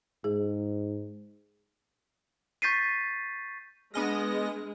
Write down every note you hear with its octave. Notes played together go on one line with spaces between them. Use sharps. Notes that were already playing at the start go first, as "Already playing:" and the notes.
G#2 G#4
C#6 G6 A6 B6 C7 D#7
G#3 B3 D4 D#5 G#5 F6 A#6